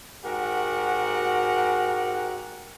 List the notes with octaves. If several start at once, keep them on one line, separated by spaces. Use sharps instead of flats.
G#2 F#4 G4 A#4 F#5